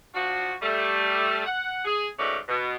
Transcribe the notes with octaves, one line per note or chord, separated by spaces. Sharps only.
F3 D4 F4 F#4
G3 A3
F#5
G#4
G#2 A3 C#4 F#4 B4 D5
B2